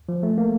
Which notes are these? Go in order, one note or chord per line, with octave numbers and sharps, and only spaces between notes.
F3
A3
A#3